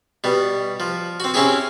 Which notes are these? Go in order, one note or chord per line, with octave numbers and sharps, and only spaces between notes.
B2 G3
F3
C4 F#4
C4 C#4 E4 G4 G#4